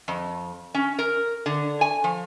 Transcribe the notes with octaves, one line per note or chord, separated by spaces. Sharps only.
F2
C#4
A#4
D3
G#5
F3